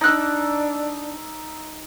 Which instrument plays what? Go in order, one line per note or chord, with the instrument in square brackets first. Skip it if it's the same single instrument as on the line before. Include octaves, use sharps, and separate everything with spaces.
[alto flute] D4 [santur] D#4 E6 [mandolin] D5 F#6